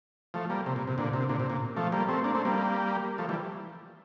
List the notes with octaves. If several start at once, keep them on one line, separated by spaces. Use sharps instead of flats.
F3 A3
G3 A#3
C3
A#2
C3
A#2 D3
C3
A#2 D3
C3
A#2
F3 A3
G3 A#3
A3 C4
A#3 D4
A3 C4
G3 A#3
F3 A3
E3 G3